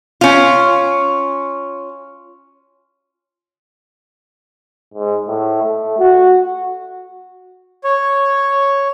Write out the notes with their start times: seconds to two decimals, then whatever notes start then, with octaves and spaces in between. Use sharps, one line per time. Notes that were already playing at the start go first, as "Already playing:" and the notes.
0.21 C#4 F4
4.94 G#2
5.28 A2
5.62 A3
5.99 F#4
7.84 C#5